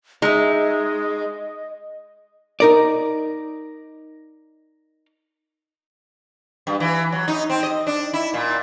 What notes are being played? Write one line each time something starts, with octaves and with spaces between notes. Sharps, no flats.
G#3 D#4 D#5 E5
D#4 A#4 D5
G2
E3
F#3
D#4
C4
D#5
D4
E4
A#2